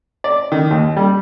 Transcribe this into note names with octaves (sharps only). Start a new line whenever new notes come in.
D5
D#3
D#2
G3